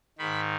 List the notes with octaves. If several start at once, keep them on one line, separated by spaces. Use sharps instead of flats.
G#2 D#3 B5